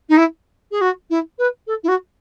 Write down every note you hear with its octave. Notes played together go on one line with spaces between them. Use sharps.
D#4
E4
G#4
F#4
E4
B4
A4
E4
F#4